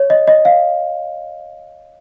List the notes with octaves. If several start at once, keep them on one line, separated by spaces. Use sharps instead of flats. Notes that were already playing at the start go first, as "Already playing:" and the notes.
Already playing: C#5
D#5
D#5
F5